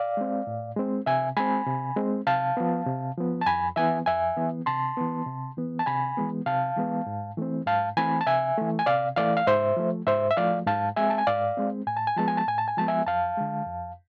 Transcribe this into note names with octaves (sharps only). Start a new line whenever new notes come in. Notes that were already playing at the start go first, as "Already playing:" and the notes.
Already playing: D5 F5
G#3 C4
A2
G#3 C4
C3 E5 G#5
G#3 C4 G#5 B5
C3
G#3 C4
C3 F5 A5
F3 B3
C3
F3 B3
A5
F2 G#5 B5
E3 B3 E5 G#5
F2 E5 G#5
E3 B3
C3 A5 C6
E3 B3
C3
E3 B3
A5
C3 G#5 B5
E3 G#3 B3
C3 F5 A5
E3 G#3 B3
G#2
E3 A3 C4
G#2 F5 A5
E3 A3 C4 G#5 B5
A5
C3 E5 G#5
E3 A3
G#5
C3 D5 F5
E3 A3 D5 F5
F5
G#2 C5 E5
F3 A3
G#2 C5 E5
E5
F3 A3 D5 F5
G#2 F5 A5
G#3 C4 E5 G#5
A5
G#5
G#2 D5 F5
G#3 C4
A2 G#5
A5
G#5
F3 G#3 B3 A5
G#5
A5
A2 G#5
A5
G#5
F3 G#3 B3 A5
E5 G#5
F2 F5 A5
D3 G#3
F2